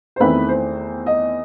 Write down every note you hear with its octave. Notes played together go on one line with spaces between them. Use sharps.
C5
E2 D#3 A3 C4 E4 B4
C5
D#5